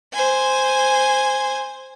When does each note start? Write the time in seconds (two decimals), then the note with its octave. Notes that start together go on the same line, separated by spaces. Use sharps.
0.13 C5 G#5